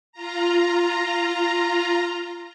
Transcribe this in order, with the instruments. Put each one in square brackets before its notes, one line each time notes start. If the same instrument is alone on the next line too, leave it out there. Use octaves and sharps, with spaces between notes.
[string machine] F4 A#5